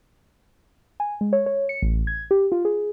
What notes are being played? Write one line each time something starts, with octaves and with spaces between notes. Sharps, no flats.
G#5
G#3
C#5
C#5
C#7
A1
G#6
G4
F4
G#4